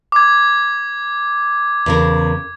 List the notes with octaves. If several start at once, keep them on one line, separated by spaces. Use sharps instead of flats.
D6 G#6
E2 C#3 A#4